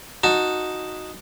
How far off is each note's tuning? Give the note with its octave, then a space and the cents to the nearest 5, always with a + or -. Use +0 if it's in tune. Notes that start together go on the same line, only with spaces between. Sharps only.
D#4 +0 F#4 -10 A5 +0